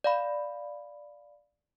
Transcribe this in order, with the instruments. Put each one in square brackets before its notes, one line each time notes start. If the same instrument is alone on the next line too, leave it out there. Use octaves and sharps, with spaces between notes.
[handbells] D5 F5 B5